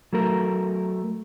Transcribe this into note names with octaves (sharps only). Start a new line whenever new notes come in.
F#3 A3 A#4